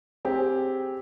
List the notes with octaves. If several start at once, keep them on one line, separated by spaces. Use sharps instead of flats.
C4 G4 G#4